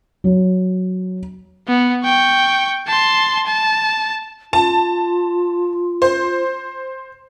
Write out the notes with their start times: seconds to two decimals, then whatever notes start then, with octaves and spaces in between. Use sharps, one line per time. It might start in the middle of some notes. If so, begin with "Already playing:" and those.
0.24 F#3
1.68 B3
2.04 G5 C#6
2.87 A5 C6
3.46 A5
4.53 F4 A5
6.02 C5